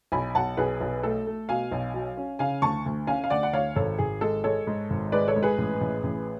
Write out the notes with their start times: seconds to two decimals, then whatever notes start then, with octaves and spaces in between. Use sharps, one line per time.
0.12 B1 G#5 B5
0.35 B1 F#5 A5
0.57 B1 G#4 B4
0.81 B1
1.03 A3 A4
1.27 A3
1.49 B2 F5 G#5
1.72 B1
1.94 F#3
2.17 C#4
2.39 C#3 F5 G#5
2.62 D2 A5 C#6
2.86 D2
3.07 C#4 F5 G#5
3.24 F5
3.30 D2 D5 F#5
3.43 F#5
3.53 D2 C#5 F5
3.76 G#1 A4 C#5
3.99 G#1 G#4
4.21 G#3 A4
4.44 G#3 A4 C#5
4.67 G#2
4.90 G#1
5.12 G#3 B4 D5
5.28 A4 C#5
5.36 G#2
5.43 G#4 B4
5.58 A1
5.81 A1
6.03 A1